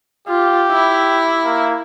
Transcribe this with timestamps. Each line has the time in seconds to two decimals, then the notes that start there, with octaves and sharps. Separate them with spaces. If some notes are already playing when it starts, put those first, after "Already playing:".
0.28 F4 G4
0.72 E4
1.45 A#3